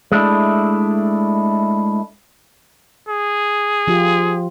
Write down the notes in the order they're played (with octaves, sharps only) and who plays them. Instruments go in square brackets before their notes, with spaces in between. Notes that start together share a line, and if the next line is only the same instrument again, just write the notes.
[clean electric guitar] G#3 A3 D4 E4
[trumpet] G#4
[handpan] F3 F4 G4